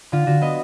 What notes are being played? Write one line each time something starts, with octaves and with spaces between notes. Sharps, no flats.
D3 F4
D3 F#4
B3 D#5